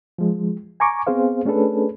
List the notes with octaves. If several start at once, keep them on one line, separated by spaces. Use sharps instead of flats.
F3 G#3
G#5 A#5 C#6 D6
B3 C4 G#4 C5 F5
A3 C#4 D4 G#4 A4 B4